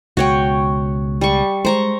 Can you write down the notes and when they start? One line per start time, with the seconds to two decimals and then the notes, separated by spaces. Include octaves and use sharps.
0.17 C#2 B2 F#4 C#5 G5
1.21 G3 C#6
1.65 G#3 C5 A#5 C#6